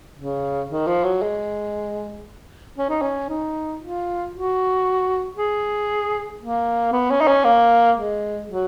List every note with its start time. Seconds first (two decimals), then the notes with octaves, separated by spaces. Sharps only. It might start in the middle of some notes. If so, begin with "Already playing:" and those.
0.17 C#3
0.70 D#3
0.87 F3
1.04 F#3
1.22 G#3
2.78 C#4
2.89 D#4
3.02 C#4
3.29 D#4
3.81 F4
4.33 F#4
5.36 G#4
6.41 A#3
6.92 B3
7.10 C#4
7.21 D#4
7.27 C#4
7.44 A#3
7.96 G#3
8.48 F#3